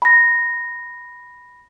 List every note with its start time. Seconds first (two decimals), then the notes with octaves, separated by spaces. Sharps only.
0.02 B5 A#6